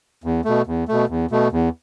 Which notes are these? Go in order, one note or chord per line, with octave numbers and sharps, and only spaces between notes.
E2
B2 A3
E2
B2 A3
E2
B2 A3
E2